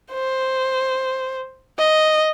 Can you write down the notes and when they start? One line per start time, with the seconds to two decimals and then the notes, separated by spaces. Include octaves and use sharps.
0.12 C5
1.78 D#5